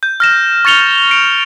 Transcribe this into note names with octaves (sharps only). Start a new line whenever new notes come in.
G6
F6 A#6 E7
C#6 A6 C#7 F7 G7
C#7 D7 F7